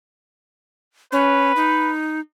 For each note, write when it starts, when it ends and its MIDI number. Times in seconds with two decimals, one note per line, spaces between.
1.12 1.52 61
1.12 1.90 71
1.56 2.20 63